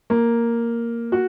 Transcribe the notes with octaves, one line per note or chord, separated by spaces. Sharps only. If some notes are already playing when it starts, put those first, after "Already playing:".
A#3
F#4